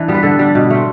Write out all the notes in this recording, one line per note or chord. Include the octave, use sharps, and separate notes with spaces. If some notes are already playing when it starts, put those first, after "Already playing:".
Already playing: E3 D4
G3 B3
B4
D3 A4
G3 D4
B2
A3 C4